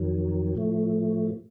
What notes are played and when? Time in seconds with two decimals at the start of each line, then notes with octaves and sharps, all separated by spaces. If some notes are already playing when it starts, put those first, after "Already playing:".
Already playing: F2 D#3 F#3
0.55 A2 F3 A3